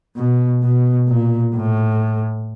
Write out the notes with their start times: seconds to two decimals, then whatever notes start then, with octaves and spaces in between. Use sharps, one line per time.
0.17 B2
0.63 B2
1.09 A#2
1.55 A2